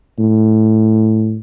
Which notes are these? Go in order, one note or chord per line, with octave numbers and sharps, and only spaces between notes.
A2